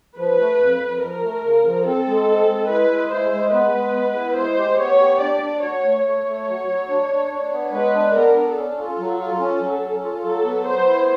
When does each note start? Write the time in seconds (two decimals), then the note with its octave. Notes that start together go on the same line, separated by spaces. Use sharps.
0.18 F3 B4
0.40 A3
0.60 F2
0.80 F2
1.02 F3 A#4
1.23 A3
1.44 C#3
1.65 F3
1.86 C4 A4
2.07 G#3
2.28 C4
2.49 G#3
2.69 E4 B4
2.90 G#3
3.12 E4 C5
3.32 G#3
3.53 B3 B4
3.74 G#3
3.95 B3
4.16 E4
4.37 G#3 C5
4.58 G4
4.79 B3 C#5
5.00 G4
5.21 D4 D5
5.42 D4
5.62 F#4 C#5
5.85 A3
6.05 A3 C#5
6.26 A3
6.47 F#3
6.68 F#3
6.89 D4
7.10 D4
7.31 D4
7.52 B3
7.72 G#3 B4
7.94 D4
8.15 B3 A#4
8.36 D4
8.56 C#4 A4
8.77 F4
8.99 F#3
9.20 F4
9.40 C#4
9.61 F#3
9.82 C#4
10.04 F4
10.24 F#3 A4
10.45 B3
10.66 B3 C5
10.87 E4